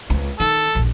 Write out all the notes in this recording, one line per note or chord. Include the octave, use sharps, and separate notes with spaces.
C#2 C4
D#3 A4
A#1 D#2